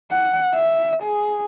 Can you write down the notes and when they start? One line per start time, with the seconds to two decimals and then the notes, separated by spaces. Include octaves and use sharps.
0.11 F#5
0.55 E5
1.03 G#4